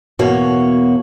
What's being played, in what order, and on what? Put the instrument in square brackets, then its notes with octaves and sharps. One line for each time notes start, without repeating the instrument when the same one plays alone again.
[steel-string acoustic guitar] E2 B2 A#3 F#4 C#5